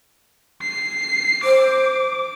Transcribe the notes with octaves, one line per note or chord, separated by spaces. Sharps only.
C7
C5 D6